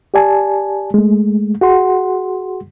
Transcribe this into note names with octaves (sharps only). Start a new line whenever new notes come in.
G4 D5 G#5 A5
G#3 A3
F#4 G#4 F#5 C6